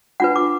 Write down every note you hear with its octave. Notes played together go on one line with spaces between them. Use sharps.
D4 F4 B4 F#5
D6